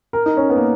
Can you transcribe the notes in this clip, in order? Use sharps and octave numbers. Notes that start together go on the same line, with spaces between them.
A#4
D#4
C#4
B3
A#3